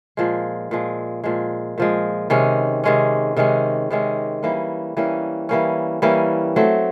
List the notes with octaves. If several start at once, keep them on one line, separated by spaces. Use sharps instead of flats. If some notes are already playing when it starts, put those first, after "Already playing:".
A#2 F3 G#3
A#2 F3 G#3
A#2 F3 G#3
A#2 F3 G#3
C3 D#3 G#3 C#4
C3 D#3 G#3 C#4
C3 D#3 G#3 C#4
C3 D#3 G#3 C#4
E3 G3 A#3 C#4
E3 G3 A#3 C#4
E3 G3 A#3 C#4
E3 G3 A#3 C#4
F#3 A3 C4